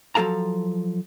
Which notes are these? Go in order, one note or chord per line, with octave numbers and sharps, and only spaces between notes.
F3 F#3 A4 F5 A#5